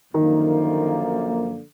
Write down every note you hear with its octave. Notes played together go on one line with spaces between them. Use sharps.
F#2 D3 D#3 F3 A#3